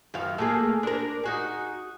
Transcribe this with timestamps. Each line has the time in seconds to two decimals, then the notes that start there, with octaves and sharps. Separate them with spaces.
0.14 F#2 D#3 F5
0.38 A3 A#3 G#4
0.83 D4 A#4
1.24 D#4 F#4 G#4